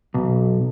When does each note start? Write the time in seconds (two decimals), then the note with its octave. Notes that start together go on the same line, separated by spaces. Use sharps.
0.14 B1